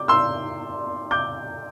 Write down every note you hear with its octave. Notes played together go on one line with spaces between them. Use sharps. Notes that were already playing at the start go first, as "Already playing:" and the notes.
Already playing: D6 G6
C6 E6
D6 G6